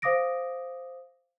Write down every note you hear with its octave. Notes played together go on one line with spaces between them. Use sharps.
C5 F5 D6 D#6 A#6 D7